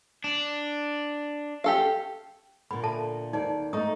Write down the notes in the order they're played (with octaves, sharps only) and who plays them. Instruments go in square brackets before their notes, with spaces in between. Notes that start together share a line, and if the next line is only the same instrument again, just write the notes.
[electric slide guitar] D4
[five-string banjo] G4 A4 F5
[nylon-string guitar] A#2 D3 [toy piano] B5
[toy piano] A4 E5 A5
[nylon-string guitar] D#2 D5 [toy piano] D#4
[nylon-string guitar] A3 D#4 [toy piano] A#5 C#6 D#6